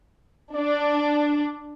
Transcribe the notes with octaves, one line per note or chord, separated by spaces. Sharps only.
D4 D5